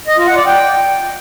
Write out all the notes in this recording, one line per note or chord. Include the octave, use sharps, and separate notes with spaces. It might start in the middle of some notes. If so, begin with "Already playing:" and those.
D#5
F4
F#5
D5
G5